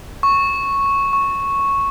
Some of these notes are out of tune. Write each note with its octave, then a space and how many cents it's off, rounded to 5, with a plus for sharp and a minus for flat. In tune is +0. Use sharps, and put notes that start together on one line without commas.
C#6 -5
C#6 -5